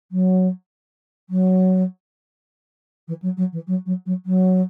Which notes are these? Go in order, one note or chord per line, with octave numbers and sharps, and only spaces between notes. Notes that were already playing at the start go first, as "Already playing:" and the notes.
F#3
F#3
E3
F#3
F#3
E3
F#3
F#3
F#3
F#3